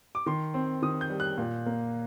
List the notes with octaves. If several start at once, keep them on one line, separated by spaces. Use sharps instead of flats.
D6
D#3 C6
C4
D#3 D#6
G6
G3
F#6
A#2
A#3